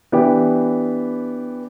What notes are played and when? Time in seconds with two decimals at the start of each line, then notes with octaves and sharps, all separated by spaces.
0.12 E3 B3 D4 G4